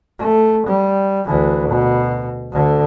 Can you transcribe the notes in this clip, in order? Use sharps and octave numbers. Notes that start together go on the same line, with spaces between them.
A3
G3
D2 E3
B2
D2 D3